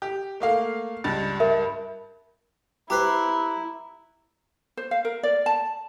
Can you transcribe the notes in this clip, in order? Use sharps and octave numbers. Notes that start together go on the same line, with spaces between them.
G4
A3 A#3 F5
C#2 G2 A6
A#4 E5
E4 G4 B4 C5 A#5
C5
F5
A#4
D5
A5